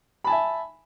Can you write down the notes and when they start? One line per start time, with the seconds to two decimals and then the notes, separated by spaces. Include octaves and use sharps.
0.25 B5
0.27 A5
0.30 G#5
0.32 E5